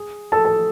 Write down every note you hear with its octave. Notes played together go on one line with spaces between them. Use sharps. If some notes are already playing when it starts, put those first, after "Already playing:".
Already playing: G#4
A4 A5
A4 A5